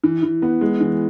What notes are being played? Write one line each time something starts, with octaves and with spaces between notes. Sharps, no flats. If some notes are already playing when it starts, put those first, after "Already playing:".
E3
E3
B3
G#3
E3